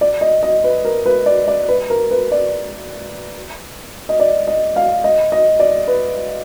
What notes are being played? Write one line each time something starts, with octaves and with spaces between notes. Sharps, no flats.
D5
D#5
D#5
B4
A#4
B4
D5
D5
B4
A#4
B4
D5
D#5
D5
D#5
F5
D#5
D#5
D5
B4